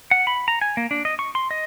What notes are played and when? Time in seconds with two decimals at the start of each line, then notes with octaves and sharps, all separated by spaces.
0.11 F#5
0.27 B5
0.48 A#5
0.61 G#5
0.77 A#3
0.91 D4
1.05 D#5
1.19 C#6
1.35 C6
1.51 D#5